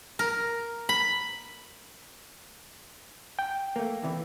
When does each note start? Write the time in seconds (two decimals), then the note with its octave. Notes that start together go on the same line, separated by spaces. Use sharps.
0.19 A#4
0.89 B5
3.39 G5
3.76 A3 A#3
4.03 E2 C3 E3